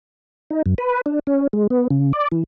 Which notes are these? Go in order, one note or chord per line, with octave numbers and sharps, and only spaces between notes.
D#4
F#2
B4
D4
C#4
G#3
B3
C#3
D5
E3